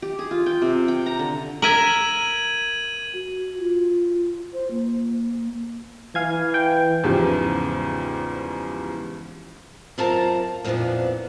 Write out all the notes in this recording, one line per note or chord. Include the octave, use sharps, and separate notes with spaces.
G4
G#4
F4
G5
C3
G5
A#5
D3
A#4 E5 G#6 D#7 F#7
F#4
F4
C5
A#3
E3 F5 G#5 G#6
G5
E2 G#2 C#3 F3 G3
F#2 C4 F4 A#4 A5 A#5
F2 A#2 E3 F3 B3 D4